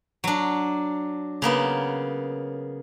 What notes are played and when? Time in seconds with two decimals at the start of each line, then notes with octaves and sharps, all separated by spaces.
0.24 F#3 D4
1.42 C#3 A#3 B3